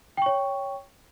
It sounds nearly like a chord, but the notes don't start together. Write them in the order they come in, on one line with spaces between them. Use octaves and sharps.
G5 C#6 C#5